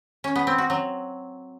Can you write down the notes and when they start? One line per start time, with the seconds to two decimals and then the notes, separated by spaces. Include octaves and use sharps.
0.24 C#4
0.36 B3
0.47 C4
0.58 F#4
0.70 F#3